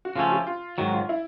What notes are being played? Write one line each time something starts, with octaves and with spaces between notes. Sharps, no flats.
F#4
C#3 F3 A3 C#4 F4
G4
F4
G#2 D#3 F#3 F#4
F4
E4